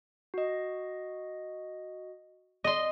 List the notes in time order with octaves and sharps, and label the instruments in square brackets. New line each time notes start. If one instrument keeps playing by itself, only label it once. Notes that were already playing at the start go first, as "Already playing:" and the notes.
[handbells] F#4 D#5
[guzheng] D#5 C6